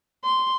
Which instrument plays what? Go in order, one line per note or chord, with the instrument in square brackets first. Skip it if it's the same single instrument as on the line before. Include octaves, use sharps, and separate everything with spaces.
[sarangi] C6